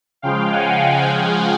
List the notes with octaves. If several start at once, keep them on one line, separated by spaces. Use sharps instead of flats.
C#3 F3 G#3 F5 G5
F#5 G#5
F#5 G#5
F5 G5